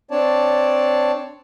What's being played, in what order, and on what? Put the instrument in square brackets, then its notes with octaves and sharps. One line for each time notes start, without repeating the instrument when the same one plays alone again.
[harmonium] C4 D4 C#5 D5 A5